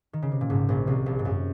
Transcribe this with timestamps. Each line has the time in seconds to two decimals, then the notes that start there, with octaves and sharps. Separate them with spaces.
0.13 D#3
0.22 C#3
0.32 C3
0.41 A#2
0.50 G#1 G#2
0.69 A#1 A#2
0.87 C2 C3
1.06 A#1 A#2
1.19 G#2
1.25 F#2